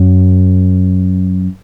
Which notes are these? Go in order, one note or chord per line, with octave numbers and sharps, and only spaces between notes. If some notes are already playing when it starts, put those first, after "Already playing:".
Already playing: F#2